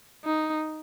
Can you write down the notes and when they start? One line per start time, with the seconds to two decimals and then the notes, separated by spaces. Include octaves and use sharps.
0.25 D#4